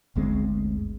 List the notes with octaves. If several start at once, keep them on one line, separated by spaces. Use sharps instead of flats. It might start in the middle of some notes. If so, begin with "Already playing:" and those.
G1 D2 G#3 C4